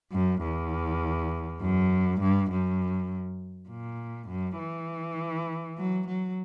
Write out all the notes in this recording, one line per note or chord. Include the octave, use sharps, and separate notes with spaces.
F#2
E2
F#2
G2
F#2
A#2
F#2
E3
F#3
F#3